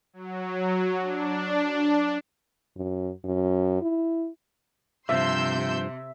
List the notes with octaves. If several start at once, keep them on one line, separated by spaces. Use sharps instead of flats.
F#3
D4
F#2
F#2
E4
G2 C3 F3 E5 C6 E6 G6